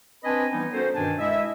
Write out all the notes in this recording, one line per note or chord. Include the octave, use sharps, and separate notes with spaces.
C4 D4 B4 D#5 G#5 B5
E3 G3 B3 C#4 D#4
C#4 F#4 A4 A#4 C5
G2 B2 D#3 D4 G#5 A5
G#3 E4 D#5 E5